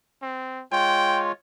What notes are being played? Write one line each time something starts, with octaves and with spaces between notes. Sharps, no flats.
C4
G#3 F4 C#5 G5